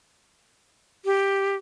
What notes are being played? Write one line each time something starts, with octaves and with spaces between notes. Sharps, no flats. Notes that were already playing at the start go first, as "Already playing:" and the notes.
G4